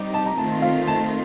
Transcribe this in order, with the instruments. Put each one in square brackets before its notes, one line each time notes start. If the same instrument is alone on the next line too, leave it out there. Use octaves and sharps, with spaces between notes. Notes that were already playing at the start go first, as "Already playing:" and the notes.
Already playing: [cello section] G3 C4 D#4 G4
[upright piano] A5
A#5
[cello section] D#3 A3 C4 F4 [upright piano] A5
[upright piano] F5
A5